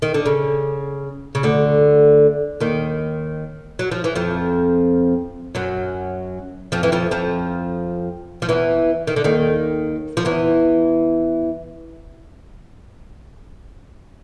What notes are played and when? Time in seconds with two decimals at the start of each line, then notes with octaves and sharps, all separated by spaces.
0.02 D#3
0.14 D3
0.26 C#3
1.35 C#3
1.43 D2 D3
2.60 D#2 D#3
3.79 F#3
3.91 F3
4.04 E3
4.15 F2 F3
5.55 F#2 F#3
6.72 F2 F3
6.83 E3
6.92 F2 F3
7.11 F2 F3
8.42 F3
8.49 E2 E3
9.07 D#3
9.16 D3
9.24 D#2 D#3
10.17 F3
10.25 E2 E3